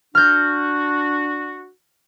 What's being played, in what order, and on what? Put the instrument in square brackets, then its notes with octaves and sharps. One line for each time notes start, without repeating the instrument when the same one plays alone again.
[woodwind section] D4 F#4 [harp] F6 G6